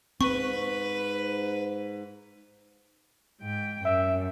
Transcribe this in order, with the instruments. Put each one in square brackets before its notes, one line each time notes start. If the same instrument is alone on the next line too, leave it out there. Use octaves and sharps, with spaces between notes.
[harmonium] G#2 [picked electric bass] C4 [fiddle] B4 [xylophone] C#6
[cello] G#2 G5
[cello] F#2 [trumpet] E5